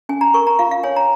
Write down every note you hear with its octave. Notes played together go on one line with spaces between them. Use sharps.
C#4 G#5
A#5
A#4 C#6
A#5
F4 F5
F5
C#5 G#5
A#5